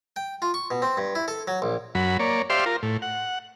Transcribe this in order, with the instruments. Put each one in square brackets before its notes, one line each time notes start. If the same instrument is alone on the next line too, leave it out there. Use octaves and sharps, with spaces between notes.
[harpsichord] G5
F4
C#6
B2
C4
G2
E4
A4
F#3
A#1
[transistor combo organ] F#2 F#3 B5
A#3 C#5 D5
G4 C5 D5 E5 F5 C6
F4 A#4
A2
F#5